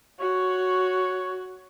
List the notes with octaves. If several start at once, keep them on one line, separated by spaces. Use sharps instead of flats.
F#4 C#5